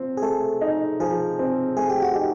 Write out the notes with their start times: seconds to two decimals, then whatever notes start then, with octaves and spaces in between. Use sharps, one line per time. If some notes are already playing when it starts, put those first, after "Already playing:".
Already playing: F3 C4
0.17 G#4
0.22 A3 A4
0.61 D#4
1.00 F3 G#4
1.39 C4
1.77 A3 G#4
1.89 G4
2.02 F#4
2.14 D#4 G4